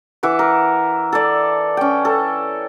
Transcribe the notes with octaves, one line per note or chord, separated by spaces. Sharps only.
E3 E5 F#5 D6
A#4
A4 D5
C#4 G5
A4